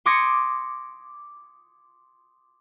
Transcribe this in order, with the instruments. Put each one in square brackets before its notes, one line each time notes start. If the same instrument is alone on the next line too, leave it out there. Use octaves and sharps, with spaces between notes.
[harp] C6 D6 D#6 G#6 A#6 C#7